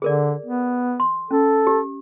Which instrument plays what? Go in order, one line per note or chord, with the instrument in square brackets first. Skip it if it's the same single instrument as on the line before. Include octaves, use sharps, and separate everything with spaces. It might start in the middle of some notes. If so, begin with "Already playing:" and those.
[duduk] D3 [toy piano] G#4 A#4 D5
[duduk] B3
[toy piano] C6
[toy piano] C#4 [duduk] A4
[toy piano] G4